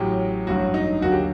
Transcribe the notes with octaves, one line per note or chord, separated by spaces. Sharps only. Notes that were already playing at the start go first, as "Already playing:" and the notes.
Already playing: A1 A2 F#3 G4
A1 G2 F#3 F#4
D#4
D#2 D3 F#3 F#4
G4